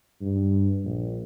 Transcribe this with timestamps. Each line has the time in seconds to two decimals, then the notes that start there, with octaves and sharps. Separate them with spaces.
0.21 G2
0.84 A#1